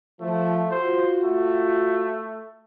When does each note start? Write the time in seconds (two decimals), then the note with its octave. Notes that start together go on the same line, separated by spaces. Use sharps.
0.21 F3 A3
0.71 F4 F#4 C5
1.24 A3